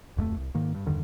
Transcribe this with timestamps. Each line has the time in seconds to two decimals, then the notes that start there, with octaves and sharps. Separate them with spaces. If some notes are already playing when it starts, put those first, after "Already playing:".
0.17 D1 F2 G#3 A3
0.36 C2
0.55 G#2 D#3 A#3
0.74 G2
0.86 E2 G2 D3 D#3